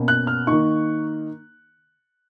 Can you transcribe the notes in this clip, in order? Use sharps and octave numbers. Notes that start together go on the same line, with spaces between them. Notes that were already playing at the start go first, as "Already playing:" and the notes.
Already playing: B2 A#3 C#4
F#6
F6
D#3 A#3 D#4 C#6